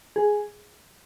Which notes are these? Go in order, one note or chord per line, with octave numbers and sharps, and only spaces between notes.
G#4